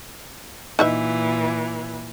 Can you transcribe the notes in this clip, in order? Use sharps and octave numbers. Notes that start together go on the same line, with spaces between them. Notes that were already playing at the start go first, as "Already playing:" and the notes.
A#2 E3 D#4 B4 E5